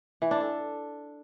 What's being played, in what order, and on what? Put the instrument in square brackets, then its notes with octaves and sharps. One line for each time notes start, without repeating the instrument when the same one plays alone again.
[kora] E3
D4
A4